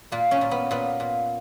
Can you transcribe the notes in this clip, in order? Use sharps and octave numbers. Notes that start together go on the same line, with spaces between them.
A#2 A#3
C#4
A#2
B3
A#2 B3
A#2